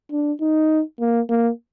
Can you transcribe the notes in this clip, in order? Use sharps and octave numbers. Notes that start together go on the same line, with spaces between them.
D4
D#4
A#3
A#3